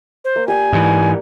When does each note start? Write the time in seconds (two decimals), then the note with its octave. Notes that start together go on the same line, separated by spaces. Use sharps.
0.25 C5
0.36 A#3
0.48 G4 D5 G5 G#5
0.72 G#2 E3